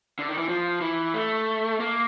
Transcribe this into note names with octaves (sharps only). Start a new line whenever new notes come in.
D3
D#3
E3
F3
E3
A3
A#3